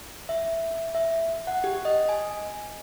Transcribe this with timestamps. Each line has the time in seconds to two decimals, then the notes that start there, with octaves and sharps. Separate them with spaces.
0.29 E5
0.95 E5
1.47 F#5
1.64 G4
1.85 D#5
2.09 G#5